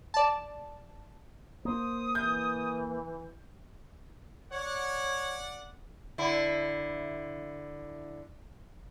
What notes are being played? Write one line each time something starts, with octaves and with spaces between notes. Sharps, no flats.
D5 A5
A#3 C5 D#6
E3 G6
C#5 D5 F#5
D3 E4